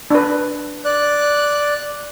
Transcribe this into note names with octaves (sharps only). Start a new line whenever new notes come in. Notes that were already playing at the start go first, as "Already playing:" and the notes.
D4 B4
D5 F#6